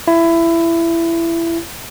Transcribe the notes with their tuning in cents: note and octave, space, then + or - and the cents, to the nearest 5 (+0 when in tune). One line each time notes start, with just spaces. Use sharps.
E4 +20